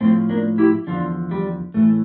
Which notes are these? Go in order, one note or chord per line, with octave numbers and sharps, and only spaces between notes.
A2 F3 A3 C4
A#3 D4
E4 G4
E2 D3 F3 D4 F4
G3
A2 E3 A3